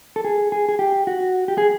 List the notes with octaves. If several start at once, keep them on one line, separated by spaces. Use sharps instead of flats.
A4
G#4
G#4
G#4
G4
F#4
G4
G#4